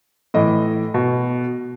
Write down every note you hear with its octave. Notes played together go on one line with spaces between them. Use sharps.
A2 E3 D#5
B2